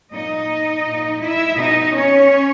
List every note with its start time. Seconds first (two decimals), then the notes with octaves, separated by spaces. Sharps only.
0.13 A#2 D#4 D#5
0.86 A#2
1.23 E4 E5
1.59 B2 D#4 D#5
1.95 C#4 C#5